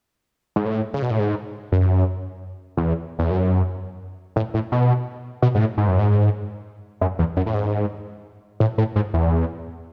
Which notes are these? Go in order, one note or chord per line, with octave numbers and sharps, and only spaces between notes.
G#2
A2
C#3
B2
A2
G#2
F#2
E2
E2
F#2
A2
A2
B2
B2
G#2
A2
G#2
F#2
G#2
F#2
E2
F#2
A2
G#2
A2
A2
G#2
E2